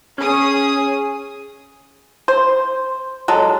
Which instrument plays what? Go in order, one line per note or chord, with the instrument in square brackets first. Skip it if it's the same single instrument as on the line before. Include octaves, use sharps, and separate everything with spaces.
[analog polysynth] C#4 [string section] G#4 D#6
[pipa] C5
F#3 G#3 A4